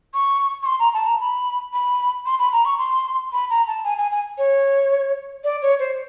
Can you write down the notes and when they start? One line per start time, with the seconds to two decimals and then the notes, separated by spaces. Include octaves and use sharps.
0.14 C#6
0.63 C#6
0.66 C6
0.80 A#5
0.94 A5
1.06 A#5
1.20 B5
1.73 B5
2.26 C6
2.39 B5
2.53 A#5
2.65 C#6
2.79 C6
3.32 B5
3.50 A#5
3.67 A5
3.84 G#5
3.98 G#5
4.11 G#5
4.38 C#5
5.44 D5
5.62 C#5
5.80 C5